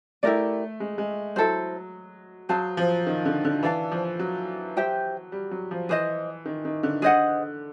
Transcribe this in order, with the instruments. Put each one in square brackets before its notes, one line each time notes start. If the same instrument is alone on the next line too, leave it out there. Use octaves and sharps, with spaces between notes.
[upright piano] A3 [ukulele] E4 G4 A#4 D5
[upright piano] G#3
G#3
[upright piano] F#3 [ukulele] E4 A4 C5
[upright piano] F#3 [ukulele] G#4 C5 F5 A5
[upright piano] F3
D#3
D3
D3
[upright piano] E3 [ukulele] A4 D5 F5 A5
[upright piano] F3
F#3
[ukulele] G4 C5 E5 G5
[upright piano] G3
F#3
F3
[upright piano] E3 [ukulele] G#4 C5 D#5
[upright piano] D#3
D#3
D3
[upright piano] D3 [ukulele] G#4 C5 D#5 F#5